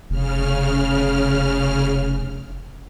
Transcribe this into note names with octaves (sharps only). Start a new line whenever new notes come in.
F1 C#3 F6